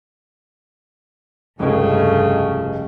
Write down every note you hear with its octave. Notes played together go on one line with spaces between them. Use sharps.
F1 C#2 G2 C#3 A3